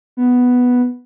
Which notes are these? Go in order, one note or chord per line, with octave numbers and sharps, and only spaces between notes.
B3